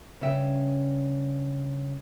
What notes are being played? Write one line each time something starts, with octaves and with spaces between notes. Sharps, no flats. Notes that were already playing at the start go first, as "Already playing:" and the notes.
G2 C#3 C#4 E5 G5